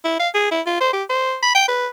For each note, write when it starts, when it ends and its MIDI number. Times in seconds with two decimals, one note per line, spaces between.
0.05 0.15 64
0.19 0.29 77
0.34 0.48 68
0.51 0.61 64
0.66 0.80 65
0.81 0.88 72
0.93 1.03 67
1.10 1.37 72
1.43 1.53 83
1.55 1.66 79
1.68 1.88 71